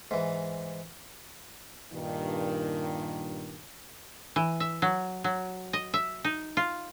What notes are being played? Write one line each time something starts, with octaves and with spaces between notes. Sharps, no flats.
G#2 E3
G2 A#2 D#3
E3
E5
F#3
F#3
D#5
E5
D#4
F4